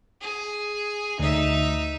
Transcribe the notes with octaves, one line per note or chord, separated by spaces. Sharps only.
G#4
D2 D#4 E5